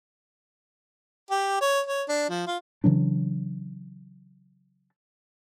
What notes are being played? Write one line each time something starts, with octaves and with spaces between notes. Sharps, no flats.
G4
C#5
C#5
D4
F3
F4
C#3 E3 F#3 D4